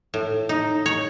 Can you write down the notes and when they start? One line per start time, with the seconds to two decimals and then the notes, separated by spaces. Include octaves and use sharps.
0.14 A2
0.49 D#4
0.86 C#5